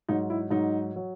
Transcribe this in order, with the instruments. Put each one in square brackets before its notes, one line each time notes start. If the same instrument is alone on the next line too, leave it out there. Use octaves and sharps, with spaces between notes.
[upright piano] G#2 F#3 D#4
E4
G#2 F#3 D#4
F#3